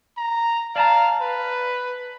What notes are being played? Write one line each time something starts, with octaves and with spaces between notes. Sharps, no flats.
A#5
D5 F5 A5 A#5
B4